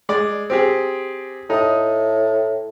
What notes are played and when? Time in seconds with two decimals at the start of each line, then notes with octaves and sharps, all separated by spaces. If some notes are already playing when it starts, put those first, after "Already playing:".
0.09 G#3 D5
0.50 C4 G4 G#4
1.50 A2 D#4 D#6